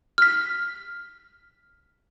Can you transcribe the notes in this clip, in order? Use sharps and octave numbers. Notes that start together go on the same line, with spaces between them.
F6 B6